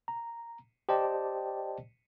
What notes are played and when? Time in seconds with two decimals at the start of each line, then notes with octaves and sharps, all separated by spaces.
0.08 A#5
0.89 G4 C5 D5 D#5 G5 A5